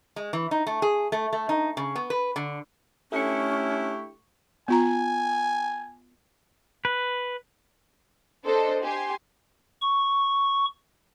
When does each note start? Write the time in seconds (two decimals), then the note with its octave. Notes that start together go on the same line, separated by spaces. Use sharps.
0.16 G#3
0.33 E3
0.51 D#4
0.67 A3
0.82 G#4
1.12 A3
1.33 A3
1.49 D#4
1.77 C#3
1.96 B3
2.10 B4
2.36 D3
3.12 A3 C#4 D4 E4 G4 C#6
4.68 B3 F4 G#5 A#5
6.85 B4
8.45 D4 A4 C5 D#5
8.83 G4 G#5 C6
9.82 C#6